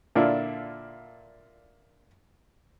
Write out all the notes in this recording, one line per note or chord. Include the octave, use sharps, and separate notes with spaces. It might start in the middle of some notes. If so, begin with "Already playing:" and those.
A#2 D3 D4 E4 F4